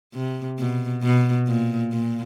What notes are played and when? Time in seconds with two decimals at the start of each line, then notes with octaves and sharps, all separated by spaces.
0.14 C3
0.59 B2
1.03 B2
1.47 A#2
1.92 A#2